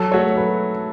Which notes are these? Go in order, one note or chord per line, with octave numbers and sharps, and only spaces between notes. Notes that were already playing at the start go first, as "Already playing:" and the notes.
Already playing: F#3 A4
A3 F#4 C#5
F#3 B4